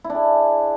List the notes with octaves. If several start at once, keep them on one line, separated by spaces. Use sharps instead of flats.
E4
D4
G#4